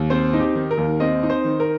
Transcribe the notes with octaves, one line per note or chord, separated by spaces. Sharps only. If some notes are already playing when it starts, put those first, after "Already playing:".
Already playing: D#2
C4 C5
D#4
G4
D#3
A#4
D#2
C4 D#5
D#4
C5
D#3
A#4